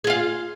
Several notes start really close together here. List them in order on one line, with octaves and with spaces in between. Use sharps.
G#4 F4 F5